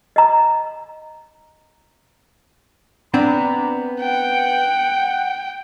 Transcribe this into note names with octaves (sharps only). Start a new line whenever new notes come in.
D#5 A#5
B3 C4 D4 A#5 B5
F#5 G5